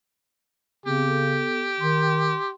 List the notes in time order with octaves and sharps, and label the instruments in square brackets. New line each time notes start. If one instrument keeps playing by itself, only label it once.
[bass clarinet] C#3 [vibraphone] B3 C4 G#4 [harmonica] G4
[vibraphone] B3 A4
[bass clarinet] D#3 [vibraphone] C6